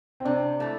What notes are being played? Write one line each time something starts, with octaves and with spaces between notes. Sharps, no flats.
C4
C3 D4
E3 A3